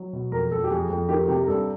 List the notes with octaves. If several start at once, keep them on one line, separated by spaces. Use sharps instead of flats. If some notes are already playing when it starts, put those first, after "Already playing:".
Already playing: F#3
B2
F2 A#4
F2 A4
G4
F2 G#4
F2
D#3 G4
C3 G4
A#4
G2 A4